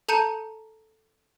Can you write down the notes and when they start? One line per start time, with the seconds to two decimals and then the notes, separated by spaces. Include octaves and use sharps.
0.08 A4 A5 A#5 G6 C#7 D#7